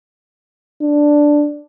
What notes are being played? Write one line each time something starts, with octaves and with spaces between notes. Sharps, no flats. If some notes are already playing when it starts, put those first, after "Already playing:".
D4